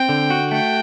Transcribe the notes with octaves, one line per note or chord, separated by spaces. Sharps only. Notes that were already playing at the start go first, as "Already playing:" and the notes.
Already playing: C4 G5
D3
F#4
A3 G5